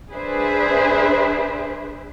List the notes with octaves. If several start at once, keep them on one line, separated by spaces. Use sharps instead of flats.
D4 G#4 B4 C5 E5